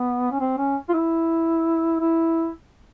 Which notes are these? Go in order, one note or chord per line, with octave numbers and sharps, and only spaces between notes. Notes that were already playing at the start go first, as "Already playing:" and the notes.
Already playing: B3
C#4
C4
C#4
F4
E4
E4